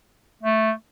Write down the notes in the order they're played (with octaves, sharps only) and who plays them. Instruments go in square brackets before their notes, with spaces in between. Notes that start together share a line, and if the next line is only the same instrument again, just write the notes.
[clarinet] A3